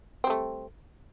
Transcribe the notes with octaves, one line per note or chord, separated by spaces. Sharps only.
G3 A3 C4